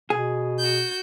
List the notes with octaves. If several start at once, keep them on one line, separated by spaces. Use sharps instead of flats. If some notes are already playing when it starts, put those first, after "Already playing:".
B2 G#4
F#4 G6